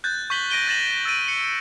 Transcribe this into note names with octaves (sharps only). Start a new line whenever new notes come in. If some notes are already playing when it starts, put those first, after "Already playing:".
F#6 G6 A6
C#6 G6 B6 F#7 G7
A#6 D7 D#7 G7
G6 A6 A#6 E7 F#7
E6 A6 D7 D#7
C#7